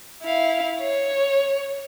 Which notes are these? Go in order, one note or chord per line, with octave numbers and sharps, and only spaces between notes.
E4 F5
C#5